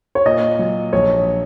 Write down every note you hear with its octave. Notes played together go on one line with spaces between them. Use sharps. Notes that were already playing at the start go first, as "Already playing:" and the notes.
C#5
A#2 D#5
F#3
A#1 C#5